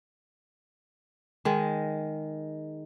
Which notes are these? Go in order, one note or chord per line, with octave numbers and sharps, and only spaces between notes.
D#3 G#3